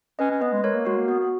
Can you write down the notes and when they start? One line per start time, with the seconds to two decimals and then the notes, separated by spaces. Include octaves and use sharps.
0.19 C#4 B4 D#5
0.31 C#4
0.41 B3 B4 D#5
0.53 G#3
0.63 G#3 A#4 C#5
0.75 A#3
0.85 G#3 F#4 A#4
0.97 A#3
1.08 B3 F#4
1.19 B3